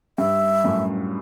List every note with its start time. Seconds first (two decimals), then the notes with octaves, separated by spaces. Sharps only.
0.18 G2 E5
0.64 F#2 A2